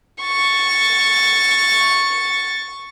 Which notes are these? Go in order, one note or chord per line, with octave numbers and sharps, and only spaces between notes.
C#6 A6